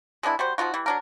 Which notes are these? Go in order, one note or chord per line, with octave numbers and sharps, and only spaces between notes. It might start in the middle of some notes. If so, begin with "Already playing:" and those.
G#3 B3 D4 E4
G3 F#4 C5
F3 D#4 F4 F#4
E3 G3
F#3 D4 A#4